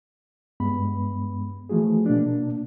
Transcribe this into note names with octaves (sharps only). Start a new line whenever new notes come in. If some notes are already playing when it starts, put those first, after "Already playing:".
G2 G#3 B3 B5
E3 F3 A3 F#4 G#4
B2 A#3 D4